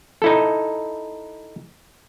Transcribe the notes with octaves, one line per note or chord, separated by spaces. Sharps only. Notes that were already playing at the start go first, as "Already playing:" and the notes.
D#4 E4 A4